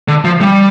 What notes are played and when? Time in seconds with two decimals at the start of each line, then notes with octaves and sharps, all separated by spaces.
0.08 D3
0.25 F3
0.41 G3